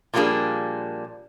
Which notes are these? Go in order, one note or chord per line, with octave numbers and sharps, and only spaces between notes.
A#2 F3 G3 A#3 D4 G#4